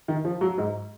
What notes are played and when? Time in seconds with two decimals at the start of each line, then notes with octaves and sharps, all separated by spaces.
0.08 D#3
0.25 F3
0.41 F#3
0.58 G#2